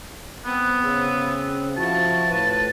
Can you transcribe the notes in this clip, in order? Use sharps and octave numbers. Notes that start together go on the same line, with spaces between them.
B3 C4
C#3 C4
F3 E4 F#4 A5
A2 B4